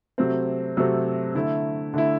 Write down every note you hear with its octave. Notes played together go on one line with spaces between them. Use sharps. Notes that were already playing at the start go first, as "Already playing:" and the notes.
C3 F#3 A3 C4
C3 F#3 A3 C4
D3 A3 E4
D3 A3 E4